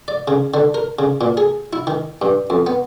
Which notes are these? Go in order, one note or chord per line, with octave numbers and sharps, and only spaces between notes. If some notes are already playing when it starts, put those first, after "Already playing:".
D5
C#3
D3
A#4
C#3
A#2
G#4
E4
D#3
G2
F2
B3